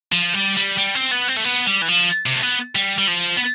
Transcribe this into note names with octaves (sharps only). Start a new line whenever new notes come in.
F3
G3
G3
G3
C4
B3
C4
A3
B3
G3
E3
F3
C3
A3
B3
G3
G3
F3
B3